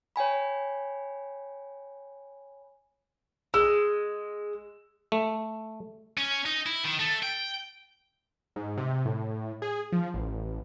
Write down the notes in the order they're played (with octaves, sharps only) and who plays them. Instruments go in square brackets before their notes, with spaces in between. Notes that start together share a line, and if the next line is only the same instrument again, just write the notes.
[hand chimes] C#5 G5 G#5 B5
[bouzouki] G#3 [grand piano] E6
[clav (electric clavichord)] A3
[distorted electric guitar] C#4
D#4
E4
D#3
A3
G5
[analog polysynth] G#2
C3
A2
G#4
F3
A1